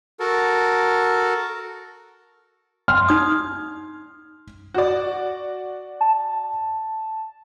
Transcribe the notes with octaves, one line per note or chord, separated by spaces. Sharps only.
F#4 A4 A#4
C6 F6
D#4 D#6
F#4 D5
A5